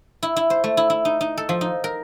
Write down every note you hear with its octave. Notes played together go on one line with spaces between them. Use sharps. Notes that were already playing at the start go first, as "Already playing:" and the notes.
E4
E4
C5
A3
E4
E4
D#4
D#4
A4
F3
D#4
A#4